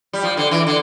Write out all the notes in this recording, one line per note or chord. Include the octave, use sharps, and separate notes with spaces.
G3
F3
D3
E3
D3